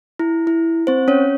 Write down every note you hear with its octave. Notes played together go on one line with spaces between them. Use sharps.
E4
E4
C4 C5
C#4 C#5